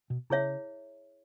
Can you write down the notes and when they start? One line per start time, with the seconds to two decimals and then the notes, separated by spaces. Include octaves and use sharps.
0.10 B2
0.30 C#3 E4 G#4 C#5 E5